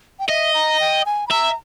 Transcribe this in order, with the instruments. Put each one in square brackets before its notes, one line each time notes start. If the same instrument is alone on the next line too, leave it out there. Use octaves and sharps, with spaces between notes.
[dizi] G5
[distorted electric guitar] D#5 [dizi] E5
[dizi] A#5
G5
G#5
B5
[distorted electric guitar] E5 [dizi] A#5